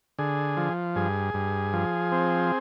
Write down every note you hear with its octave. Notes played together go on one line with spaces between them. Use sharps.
D3 G#4
F3
G2 G#4
G2
F3
C4